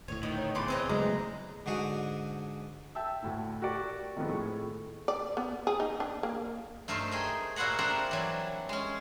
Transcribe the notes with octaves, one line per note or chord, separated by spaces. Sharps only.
D#1 D2 A2 C#5
D#3 B3
C#5
E2 B5 C6 D6
C4 B4 C#5 D#5
C#3 F#3 G#3 A3 A#5
G#2 D3 F#4 G#4
E5 G5 A5 E6
D2 A2
F#4 G4 A#4 D5
C3 D#3 F3 G#3 A3 B3
A2 G#4 C#6
D5
B3
G#4
D#4
D4
A#3
G2 A3 D#4 A#4 C5
G#4 D#5 G5
A#2 E4 F#4 C5 F#5 A#5
C4 D4 A#4 C5 A#5
E3 F#3 G3
G#3 C#4